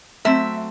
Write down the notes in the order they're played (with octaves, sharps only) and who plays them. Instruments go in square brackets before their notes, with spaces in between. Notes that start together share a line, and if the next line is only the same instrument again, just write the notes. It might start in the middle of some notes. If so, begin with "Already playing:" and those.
[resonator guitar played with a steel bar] F#3 A3 C4 E5